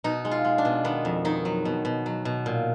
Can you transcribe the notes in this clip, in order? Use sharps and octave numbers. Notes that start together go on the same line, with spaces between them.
B2 D#4
G#3
F4
G#3
D4
B2
D#3 B3
F2
D#3 D#4
F#3
B2
B2
F#3
B2
A#2